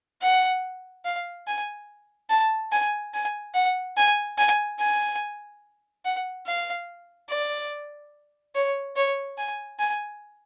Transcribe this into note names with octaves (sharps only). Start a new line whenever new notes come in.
F#5
F5
G#5
A5
G#5
G#5
F#5
G#5
G#5
G#5
F#5
F5
D5
C#5
C#5
G#5
G#5